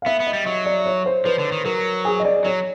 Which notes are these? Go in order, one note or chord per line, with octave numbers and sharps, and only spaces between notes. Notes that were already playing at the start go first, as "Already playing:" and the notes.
F5
B3 E5
B3
D#5
G3
F#3 D#5
D5
C#5
C5
F3 B4
D3
D#3
F#3 A#4
G#4
D#5
D5
F#3 C#5